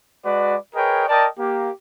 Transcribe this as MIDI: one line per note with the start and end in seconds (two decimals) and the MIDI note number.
0.25 0.55 56
0.25 0.55 66
0.25 0.55 71
0.25 0.55 74
0.75 1.04 68
0.75 1.04 70
0.75 1.04 71
0.75 1.04 73
0.75 1.04 75
0.75 1.04 79
1.09 1.27 70
1.09 1.27 74
1.09 1.27 75
1.09 1.27 79
1.09 1.27 81
1.39 1.70 58
1.39 1.70 67